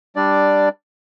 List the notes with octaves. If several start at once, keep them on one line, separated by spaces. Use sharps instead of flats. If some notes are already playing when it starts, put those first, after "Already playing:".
G3 D4 D5